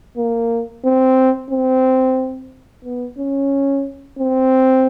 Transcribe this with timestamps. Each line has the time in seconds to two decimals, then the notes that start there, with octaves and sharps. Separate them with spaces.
0.17 A#3
0.84 C4
1.51 C4
2.84 B3
3.18 C#4
4.19 C4